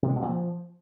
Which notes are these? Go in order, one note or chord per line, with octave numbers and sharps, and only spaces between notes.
C3
G#3
B2
A#2
F3